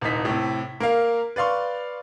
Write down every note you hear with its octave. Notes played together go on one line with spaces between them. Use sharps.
D#1 C2 D#4 B6
A2 C3
A#3 A#4 F5
B4 D5 F5 C6 C#6